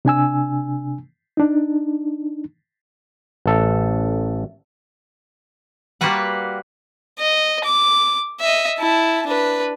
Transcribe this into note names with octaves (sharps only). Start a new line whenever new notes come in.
C3 D4 G#5 E6
D4 D#4
A1 A4
G3 A#3 F4 F#4 B4 F#5
D#5
D6
D#5 E5
E4 A5
D4 B4